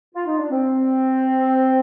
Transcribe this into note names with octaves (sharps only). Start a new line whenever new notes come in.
F4
D#4
D4
C4